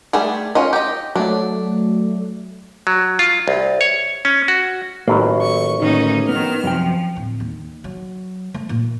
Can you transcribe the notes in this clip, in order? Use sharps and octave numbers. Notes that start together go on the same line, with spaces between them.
G3 A3 G#4
C#4 F4 D#5
G4 D#5
F#3 A3 D4
F#3
F4
C2
C#5
C#4
F#4
A1 D#3 E3 F#3 A#3
C#6
D2 A2 D#3 A#3 C#4 D#4
D#3 B3 F6
F#2 C3 F3 G5
D1
D#2
F#3
A3
A#2